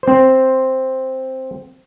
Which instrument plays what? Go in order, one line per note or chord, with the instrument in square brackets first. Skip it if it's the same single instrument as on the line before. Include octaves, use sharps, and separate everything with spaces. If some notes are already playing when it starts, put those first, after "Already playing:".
[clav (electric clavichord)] C4 C5